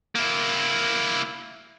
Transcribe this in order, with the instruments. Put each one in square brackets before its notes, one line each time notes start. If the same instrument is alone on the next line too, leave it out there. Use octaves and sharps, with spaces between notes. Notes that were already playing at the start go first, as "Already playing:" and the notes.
[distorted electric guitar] A#3 E4